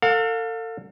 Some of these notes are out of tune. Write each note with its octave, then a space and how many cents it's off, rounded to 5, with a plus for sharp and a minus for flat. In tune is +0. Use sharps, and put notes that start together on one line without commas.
A4 +35 F5 +30